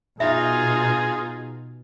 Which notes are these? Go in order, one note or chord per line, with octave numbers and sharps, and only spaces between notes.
B2 D#4 F4 G#4 E5